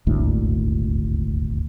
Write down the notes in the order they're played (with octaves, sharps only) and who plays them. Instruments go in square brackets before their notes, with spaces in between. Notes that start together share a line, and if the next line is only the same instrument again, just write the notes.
[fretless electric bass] D#1 G#1 D2 A2